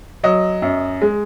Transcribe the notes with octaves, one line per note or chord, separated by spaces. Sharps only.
F#3 D#5
F#2
G#3